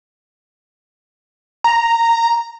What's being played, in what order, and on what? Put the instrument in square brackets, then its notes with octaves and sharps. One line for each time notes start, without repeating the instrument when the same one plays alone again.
[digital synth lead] A#5